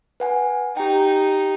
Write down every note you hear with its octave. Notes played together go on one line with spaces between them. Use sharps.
B4 F#5 G#5
D#4 G4 G5